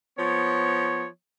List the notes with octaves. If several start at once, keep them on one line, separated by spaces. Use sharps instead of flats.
F3 B3 C#5